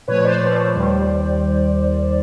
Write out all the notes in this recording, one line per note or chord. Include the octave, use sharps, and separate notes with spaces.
A#2 F3 A3 B4 C#5
C5 D5
A#2 F3 A3
D#2 D#3 G3